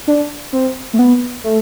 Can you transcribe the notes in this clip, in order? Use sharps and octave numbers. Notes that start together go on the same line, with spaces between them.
D4
C4
A3
B3
A3